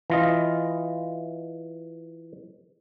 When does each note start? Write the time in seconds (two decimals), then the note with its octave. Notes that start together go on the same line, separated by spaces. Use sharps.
0.10 E3 F4 D#5